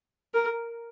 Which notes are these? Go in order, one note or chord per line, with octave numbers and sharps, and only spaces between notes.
A#4